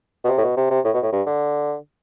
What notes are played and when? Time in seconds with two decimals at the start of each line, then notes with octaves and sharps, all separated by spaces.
0.24 B2
0.28 C3
0.38 A2
0.43 B2
0.57 C3
0.70 C3
0.85 A2
0.94 B2
1.02 A2
1.13 G2
1.26 D3